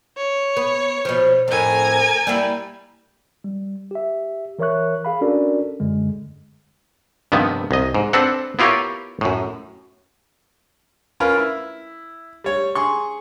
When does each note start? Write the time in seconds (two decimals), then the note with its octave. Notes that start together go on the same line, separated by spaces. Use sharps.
0.17 C#5
0.57 B3
1.05 B2 F3
1.48 F2 A2 A#4 G#5
2.27 G3 A#3 E4
3.44 G3
3.91 G4 E5
4.59 E3 A#4 C#5 E5 C#6 F#6
5.05 G#4 F5 B5
5.21 C#4 D4 F#4 A4 A#4 D5
5.80 F#2 D3 G#3
7.32 G2 C3 D#3 F3 B3
7.71 C2 D#5
7.94 G#2
8.13 C4 D4 A4 B4 F#5
8.59 B3 E4 F4 G4 A#4 C#5
9.21 F#2 A2
11.20 C#4 F4 A#4 B4
11.37 E4
12.44 G3 C#5
12.75 G#4 C6 C#6